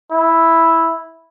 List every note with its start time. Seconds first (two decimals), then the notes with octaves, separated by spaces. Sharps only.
0.11 E4